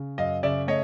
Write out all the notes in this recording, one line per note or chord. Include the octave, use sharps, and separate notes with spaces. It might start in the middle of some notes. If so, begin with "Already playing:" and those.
Already playing: C#3
F#2 D#5 F5
C#3 D5 E5
A3 C#5 D#5